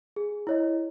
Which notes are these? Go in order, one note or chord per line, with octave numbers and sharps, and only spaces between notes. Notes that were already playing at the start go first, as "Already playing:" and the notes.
G#4
E4 C#5 D#5